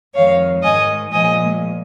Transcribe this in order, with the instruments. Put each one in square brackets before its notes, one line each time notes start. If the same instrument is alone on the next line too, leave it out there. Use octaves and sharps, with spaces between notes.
[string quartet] F2 D#3 G#3 C#5 F5
G#2 D#3 G#3 D#5 G#5
A#2 F3 G#3 D#5 G#5